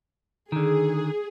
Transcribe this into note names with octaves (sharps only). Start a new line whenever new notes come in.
D3 D#3 G#4